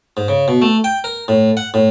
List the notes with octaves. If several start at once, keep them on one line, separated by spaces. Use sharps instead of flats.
G#2
C#3
B2
A3
G5
A#4
A2
F#5
A2